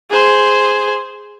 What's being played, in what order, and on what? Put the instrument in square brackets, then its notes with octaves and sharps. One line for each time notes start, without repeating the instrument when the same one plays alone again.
[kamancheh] G#4 C5